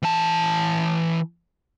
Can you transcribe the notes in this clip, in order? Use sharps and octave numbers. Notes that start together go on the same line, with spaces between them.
E3 A5